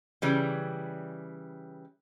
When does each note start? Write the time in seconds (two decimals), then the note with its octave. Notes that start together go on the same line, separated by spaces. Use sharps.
0.22 C#3 E3 G3